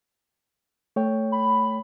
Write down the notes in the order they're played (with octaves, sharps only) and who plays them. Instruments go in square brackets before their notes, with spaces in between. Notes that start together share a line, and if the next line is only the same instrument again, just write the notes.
[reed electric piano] A3 C#5 G5
[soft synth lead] B5